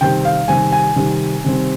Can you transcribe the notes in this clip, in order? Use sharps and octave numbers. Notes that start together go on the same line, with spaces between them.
C3 D#3 G3 C4 G5
F5
C3 D#3 G3 C4 G#5
G#5
C3 D#3 G3 C4
C3 D#3 G3 C4